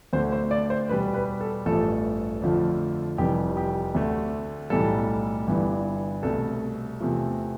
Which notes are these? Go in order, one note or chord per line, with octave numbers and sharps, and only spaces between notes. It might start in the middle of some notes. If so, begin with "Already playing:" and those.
D2 D3 A3 C5
C5
D5
C5
E2 B2 G3 B4
B4
A4
A1 G2 F3 A3 A4
F2 D3 F3 A3
F1 F2 E3 G3 G4
G4
D2 D3 A3
B1 A2 E3 G3 A4
G1 G2 E3
C2 B2 A3 A4
E2 C3 F3 A3